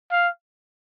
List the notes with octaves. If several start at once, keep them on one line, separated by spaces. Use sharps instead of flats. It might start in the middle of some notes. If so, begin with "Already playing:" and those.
F5